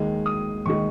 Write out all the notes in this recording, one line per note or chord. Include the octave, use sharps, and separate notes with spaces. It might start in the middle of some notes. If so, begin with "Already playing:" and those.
Already playing: D#2 D#3 G#3
D#6
D#2 D#3 G#3 C#6